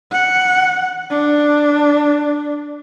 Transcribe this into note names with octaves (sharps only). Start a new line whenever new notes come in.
F#5
D4